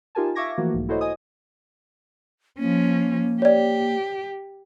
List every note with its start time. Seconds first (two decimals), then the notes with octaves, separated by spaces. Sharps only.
0.15 D#4 F4 G4 A#4 G#5 A5
0.35 E5 F5 C#6 D6 G#6 A#6
0.58 E3 F3 A3 A#3 F#4
0.74 B1 G#2
0.89 E4 F#4 A4 C5 C#5 D#5
1.01 D#5 G#5 D#6
2.59 F3 A#3 C#4
3.42 G4 C#5 D5